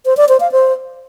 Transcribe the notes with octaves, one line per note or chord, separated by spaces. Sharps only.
C5
D5
C5
F5
C5